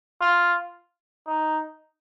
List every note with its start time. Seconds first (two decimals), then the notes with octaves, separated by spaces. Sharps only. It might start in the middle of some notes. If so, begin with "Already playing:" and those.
0.21 F4
1.27 D#4